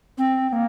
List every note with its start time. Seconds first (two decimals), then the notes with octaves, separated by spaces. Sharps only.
0.18 C4
0.49 C4
0.53 A#3